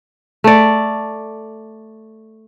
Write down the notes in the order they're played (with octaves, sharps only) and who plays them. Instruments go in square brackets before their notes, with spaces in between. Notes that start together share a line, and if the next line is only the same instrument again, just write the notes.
[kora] A3 D5